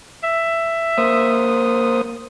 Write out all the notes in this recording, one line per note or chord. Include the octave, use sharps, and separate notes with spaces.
E5
A#3 C5 D#6